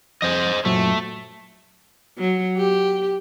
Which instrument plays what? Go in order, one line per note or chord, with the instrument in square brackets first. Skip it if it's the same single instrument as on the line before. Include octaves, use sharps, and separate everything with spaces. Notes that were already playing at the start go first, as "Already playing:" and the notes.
[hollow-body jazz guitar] F2 [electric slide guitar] C5 D#5
[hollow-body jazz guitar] F#2 A#2 F#3 [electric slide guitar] A3
[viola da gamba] F#3
G4